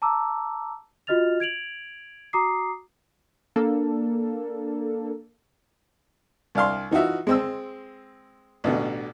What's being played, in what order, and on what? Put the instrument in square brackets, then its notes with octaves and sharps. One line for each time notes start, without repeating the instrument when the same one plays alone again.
[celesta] A5 A#5 D6 E6
F4 F#4 D#5 F6 A6 F7
G#6 D7 F7 F#7
F#4 A#5 D6 D#6 C7
[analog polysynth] A#3 D4 A4
[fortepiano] C2 D4 F5 C6
E3 D#4 F4 F#4 E5
G#3 C4 E6
A1 B2 D3